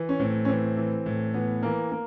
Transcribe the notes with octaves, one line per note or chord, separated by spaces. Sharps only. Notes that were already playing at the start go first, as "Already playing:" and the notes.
Already playing: E3
C#4
A2 C4
C#4
E3 C4
E3
A2
E3 B3
E3 A#3
A#3